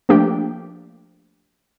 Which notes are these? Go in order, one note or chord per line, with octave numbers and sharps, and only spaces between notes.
F3 A3 A#3 D4 G4